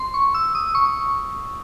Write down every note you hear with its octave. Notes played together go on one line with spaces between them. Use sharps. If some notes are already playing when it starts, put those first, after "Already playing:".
Already playing: C6
C#6
E6
D#6
C#6